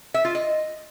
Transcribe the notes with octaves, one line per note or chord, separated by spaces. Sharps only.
E5
F4
D#5